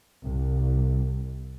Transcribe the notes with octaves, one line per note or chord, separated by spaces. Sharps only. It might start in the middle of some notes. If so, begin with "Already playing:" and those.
C2